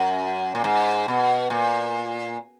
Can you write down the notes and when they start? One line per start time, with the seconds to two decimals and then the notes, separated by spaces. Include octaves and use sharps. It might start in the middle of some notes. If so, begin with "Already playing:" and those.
Already playing: F#2
0.55 A#2
0.64 G#2
1.08 B2
1.50 A#2